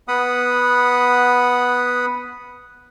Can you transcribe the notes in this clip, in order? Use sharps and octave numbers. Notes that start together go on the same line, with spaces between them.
B3 F#5 B5 D#6